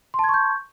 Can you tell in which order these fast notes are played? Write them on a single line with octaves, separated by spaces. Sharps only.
C6 A5 G#6 C#6 G6